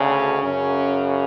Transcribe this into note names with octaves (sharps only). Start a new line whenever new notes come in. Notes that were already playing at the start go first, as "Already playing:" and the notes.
Already playing: D2 C#3
C#4
F#2 C#3 C#4